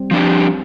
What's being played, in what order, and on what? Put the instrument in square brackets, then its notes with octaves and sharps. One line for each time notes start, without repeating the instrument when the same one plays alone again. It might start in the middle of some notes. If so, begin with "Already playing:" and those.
Already playing: [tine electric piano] G3 C4
[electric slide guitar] F3 D4 G4